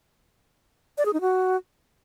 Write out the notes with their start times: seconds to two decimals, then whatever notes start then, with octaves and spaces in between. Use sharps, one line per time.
0.98 D5
1.06 G#4
1.13 D#4
1.21 F#4